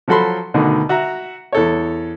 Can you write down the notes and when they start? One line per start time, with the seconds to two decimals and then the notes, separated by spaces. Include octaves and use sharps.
0.08 F3 F#3 F#4 A4 B5 C6
0.54 D2 B2 D3 D#3
0.89 F#4 E5 A#5 F#6
1.52 E2 A4 C#5